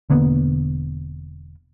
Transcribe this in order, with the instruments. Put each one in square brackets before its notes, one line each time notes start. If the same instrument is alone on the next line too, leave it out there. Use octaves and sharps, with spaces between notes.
[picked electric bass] E1 D3 A#3 B3